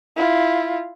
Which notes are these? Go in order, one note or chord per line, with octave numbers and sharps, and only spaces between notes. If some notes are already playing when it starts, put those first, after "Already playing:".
E4 F4